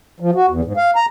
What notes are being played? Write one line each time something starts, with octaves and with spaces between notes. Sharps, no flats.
F3
F#4
E2
G#2
F5
A#5